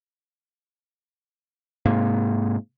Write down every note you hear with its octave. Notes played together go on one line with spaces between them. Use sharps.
G#2 C3 A#3